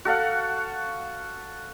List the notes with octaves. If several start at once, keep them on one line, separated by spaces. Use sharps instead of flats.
F#4 A4 F5 F#5